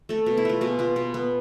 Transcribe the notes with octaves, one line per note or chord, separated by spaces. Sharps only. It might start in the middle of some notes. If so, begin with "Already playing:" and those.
A3 A4
B2
E4
A3 F4
B2 G#4
B3 F4
B2
B3